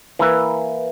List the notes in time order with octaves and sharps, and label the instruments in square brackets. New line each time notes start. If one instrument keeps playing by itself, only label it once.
[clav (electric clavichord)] E3 A#3 E4 B4